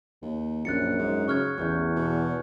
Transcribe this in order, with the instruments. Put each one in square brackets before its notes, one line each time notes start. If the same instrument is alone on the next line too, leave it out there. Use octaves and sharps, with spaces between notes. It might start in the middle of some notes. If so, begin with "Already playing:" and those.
[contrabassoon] D#2
[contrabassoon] A#1 [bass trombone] F#2 [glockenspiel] F#6 A6 C#7
[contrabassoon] G#2
[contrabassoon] C#3 [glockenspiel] C#6 F6 G#6
[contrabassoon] A1 [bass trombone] E2 [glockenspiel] C#6 F6 G6
[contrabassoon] B2